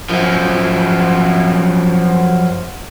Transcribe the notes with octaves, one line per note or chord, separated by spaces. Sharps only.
F#2 F3